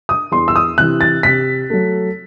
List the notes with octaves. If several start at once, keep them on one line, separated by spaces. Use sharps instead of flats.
D#6
E2 C6
E6
D#6
C3 E3 F#6
A6
C3 B6
F#3 A3